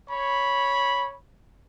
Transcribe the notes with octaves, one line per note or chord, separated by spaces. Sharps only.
C#5 B5